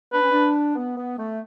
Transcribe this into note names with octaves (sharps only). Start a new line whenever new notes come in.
D4 B4
C#4
D4
B3
B3
A3